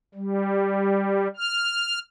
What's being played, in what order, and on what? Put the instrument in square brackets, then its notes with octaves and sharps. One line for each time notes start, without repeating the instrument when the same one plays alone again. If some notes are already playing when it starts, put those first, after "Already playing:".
[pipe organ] G3
F6